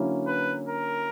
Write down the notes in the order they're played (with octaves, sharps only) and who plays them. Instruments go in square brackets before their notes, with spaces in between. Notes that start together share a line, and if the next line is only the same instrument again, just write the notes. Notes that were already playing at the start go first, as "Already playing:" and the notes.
Already playing: [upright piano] D3 F#3 A#3 C#4 E4
[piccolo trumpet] B4
A#4